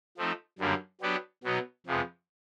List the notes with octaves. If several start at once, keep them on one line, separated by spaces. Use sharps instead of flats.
F3 A3 C4 D#4
F#2 D3 G3 A#3
F#3 B3 D4 G4 B4
B2 F#3 B3 D#4
F2 C3 F3 G#3 B3